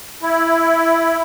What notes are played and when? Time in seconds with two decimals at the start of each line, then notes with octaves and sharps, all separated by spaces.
0.22 E4